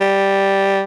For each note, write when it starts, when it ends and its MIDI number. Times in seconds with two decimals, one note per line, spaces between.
0.01 0.81 55